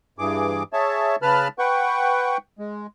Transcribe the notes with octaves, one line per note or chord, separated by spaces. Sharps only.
G2 E3 G#4 D6
G#4 C#5 E5 A5
C#3 B4 A5 B5 F6
B4 F#5 G5 C#6
G#3